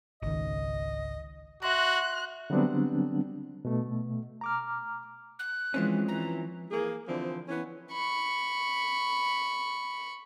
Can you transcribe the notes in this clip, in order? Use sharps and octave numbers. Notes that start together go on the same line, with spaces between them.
G#1 C#2 D#3 D#5
F#4 E5 C6 F#6 A#6
D3 F#3 G3 B3 C4 D4
B2 A3
A#5 D6 F6
F#6
E3 F3 G#3 C4 C#4
E3 A#5
E3 A#3 G#4
D3 E3 F3 C4
E3 B3 C#4
B5 C#6